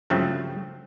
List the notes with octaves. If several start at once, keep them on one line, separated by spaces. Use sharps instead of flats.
G2 C#3 F3 F#3 A3 C4